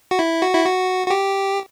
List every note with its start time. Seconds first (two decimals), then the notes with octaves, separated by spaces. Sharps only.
0.11 F#4
0.19 E4
0.42 F#4
0.54 E4
0.65 F#4
1.07 F#4
1.10 G4